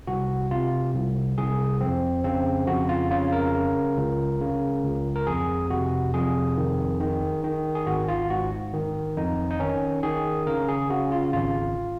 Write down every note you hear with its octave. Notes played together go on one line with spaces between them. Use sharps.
C2 F#4
C3 F4
C2
C2 G#4
F2 C4
C#3 C4
F2 F#4
F4
C#3 F4
A#4
C#3
C#2
C#3
C#2
A#4
F2 G#4
C3 F#4
F2 G#4
D#3
D#3
D#3
G#4
G#1 F#4
F4
G#2 F#4
D#3
F2 D#4
D#4
D#3 C#4
D#3 G#4
C#3 A#4
G#4
C#3 F#4
F4
G#1 F4